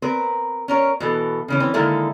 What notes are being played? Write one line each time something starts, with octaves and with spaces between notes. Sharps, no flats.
C4 A#4 B4
C#4 A#4 C#5
B2 E3 A4
C#3 E3 C#4
E3 C4 C#4
D3 D#3 G#3 A#3 E4 A4